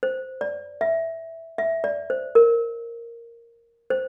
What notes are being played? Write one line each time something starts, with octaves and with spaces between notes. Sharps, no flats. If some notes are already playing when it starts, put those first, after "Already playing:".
C5
D5
E5
E5
D5
C5
A#4
C5